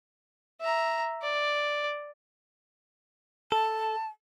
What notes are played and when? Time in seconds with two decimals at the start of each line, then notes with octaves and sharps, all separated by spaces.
0.61 E5 A#5
1.22 D5
3.52 A4 A5